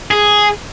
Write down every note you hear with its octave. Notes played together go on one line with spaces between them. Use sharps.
G#4